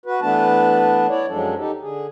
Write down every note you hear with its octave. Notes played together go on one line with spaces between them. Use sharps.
F#4 B4
E3 A3 B3 D4 B4 A5
E4 C#5 D5
F#2 F3 F#3 G#3 D4 A4
D#4 G4 A4
D3 G#4